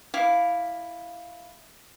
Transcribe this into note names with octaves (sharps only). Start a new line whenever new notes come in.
E4 F5 D6